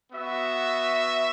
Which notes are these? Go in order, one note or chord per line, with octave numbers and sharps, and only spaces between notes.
B3 F#4 E5